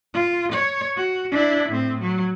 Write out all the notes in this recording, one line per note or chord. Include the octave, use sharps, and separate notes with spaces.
F4
C#5
F#4
D4 E4
A2 C4
F#3